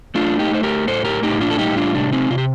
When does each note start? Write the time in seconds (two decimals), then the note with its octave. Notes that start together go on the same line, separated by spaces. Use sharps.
0.15 A3 D4 F4
0.39 D#4 G4
0.51 A3 C5
0.63 G4 A#4
0.87 A2 A4 C5
1.05 G4 A#4
1.23 A2 D#4 G4
1.40 D4 F4
1.51 A4
1.59 G3 D#4 G4
1.77 D4 F4
1.95 C3 D4
2.12 C4 D#4
2.30 C3 F4
2.38 G4